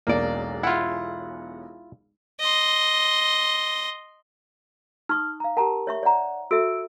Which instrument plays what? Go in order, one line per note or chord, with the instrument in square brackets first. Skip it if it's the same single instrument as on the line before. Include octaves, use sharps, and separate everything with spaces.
[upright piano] E1 B1 E2 [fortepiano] A#3 D5
[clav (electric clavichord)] E4 F4 [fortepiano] F#5
[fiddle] D#5 C6
[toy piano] D#4 C#6 D#6 [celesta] F6
[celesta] F5 A#5
[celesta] G4 A#4 [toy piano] F#5 A5 A#5
[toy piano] C#5 E5 C#6
[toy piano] C#5 A#5 [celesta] D5 F#5
[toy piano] F#4 A4 E5 [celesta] E6 D7